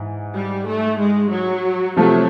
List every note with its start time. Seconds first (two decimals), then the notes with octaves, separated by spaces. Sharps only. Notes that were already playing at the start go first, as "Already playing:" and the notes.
Already playing: G#2 E3
0.35 G3
0.67 A3
1.00 G#3
1.31 F#3
1.96 C3 F3 F#3 A3